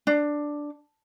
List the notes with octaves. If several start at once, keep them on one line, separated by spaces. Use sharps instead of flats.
D4